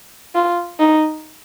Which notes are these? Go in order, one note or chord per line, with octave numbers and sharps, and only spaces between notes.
F4
D#4